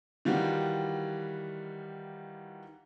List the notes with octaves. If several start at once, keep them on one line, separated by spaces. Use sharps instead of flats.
D#3 E3 G3 F4 F#4